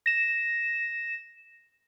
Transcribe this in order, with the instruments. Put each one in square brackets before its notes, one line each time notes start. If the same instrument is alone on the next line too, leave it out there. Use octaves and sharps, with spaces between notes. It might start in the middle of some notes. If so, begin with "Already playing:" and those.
[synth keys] A#6 E7